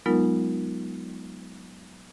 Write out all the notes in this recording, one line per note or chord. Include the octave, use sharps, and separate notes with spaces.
F#3 G#3 B3 D#4 F4 A#4